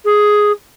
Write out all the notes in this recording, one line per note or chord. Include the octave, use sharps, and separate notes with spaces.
G#4